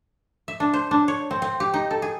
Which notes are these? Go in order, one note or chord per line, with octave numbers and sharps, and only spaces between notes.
E5
D4
C5
D4
C#5
C4
C4
G4
D#4
A4
G#4